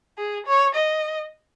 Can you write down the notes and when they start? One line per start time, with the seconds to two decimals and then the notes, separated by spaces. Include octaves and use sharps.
0.18 G#4
0.47 C#5
0.75 D#5